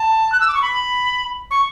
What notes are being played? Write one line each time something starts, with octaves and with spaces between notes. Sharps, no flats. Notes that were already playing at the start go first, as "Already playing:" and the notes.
Already playing: A5
F#6
E6
D6
C#6
B5
C#6